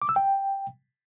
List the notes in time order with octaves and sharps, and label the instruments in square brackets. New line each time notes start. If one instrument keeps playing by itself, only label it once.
[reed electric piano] D6
E6
G5